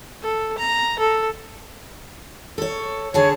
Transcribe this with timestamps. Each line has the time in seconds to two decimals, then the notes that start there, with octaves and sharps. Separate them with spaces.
0.22 A4
0.58 A#5
0.99 A4
2.58 A4 C#5
3.14 D3 G#4 C#5 A5